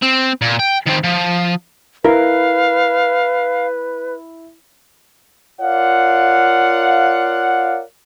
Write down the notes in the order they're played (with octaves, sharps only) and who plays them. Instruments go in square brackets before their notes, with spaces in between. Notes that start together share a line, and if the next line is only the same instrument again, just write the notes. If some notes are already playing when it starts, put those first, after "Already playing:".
[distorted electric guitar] C4
A#2
G5
D#3 C4
F3
[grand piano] E4 [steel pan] A#4 [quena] B4 [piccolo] F5
[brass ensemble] F4 A#4 C#5 D5 F5 F#5